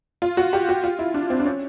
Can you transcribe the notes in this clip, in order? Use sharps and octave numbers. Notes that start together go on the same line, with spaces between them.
F4
F#4
G4
F#4
F4
E4
D4
C4
D4
C#4